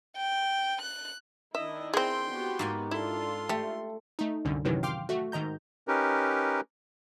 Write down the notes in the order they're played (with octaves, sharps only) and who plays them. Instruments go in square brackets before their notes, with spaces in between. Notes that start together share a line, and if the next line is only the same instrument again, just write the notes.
[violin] G5
F#6
[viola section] D#3 D4 E4 [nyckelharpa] D#5 [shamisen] E5
[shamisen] C4 G#4 [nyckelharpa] G5 C6
[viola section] B3 F#4 G4
[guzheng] G#2 A#3 G#5
[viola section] D4 F4 [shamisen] E4 [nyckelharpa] A4 C6
[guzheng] A3 [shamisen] G4
[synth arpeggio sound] A3 D#4
C2 F#2 D3
F#2 A2 C3 D#3 E3 F#3
F5 G5 C6 D6 F6
A3 F#4
G#2 D#3 D#5 A#5 G6
[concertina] C#4 D#4 G4 A#4 B4